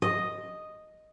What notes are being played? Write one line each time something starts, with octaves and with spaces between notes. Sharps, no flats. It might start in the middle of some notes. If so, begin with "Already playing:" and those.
D#5